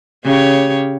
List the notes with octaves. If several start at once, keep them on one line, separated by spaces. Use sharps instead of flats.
C#3 G4 C#5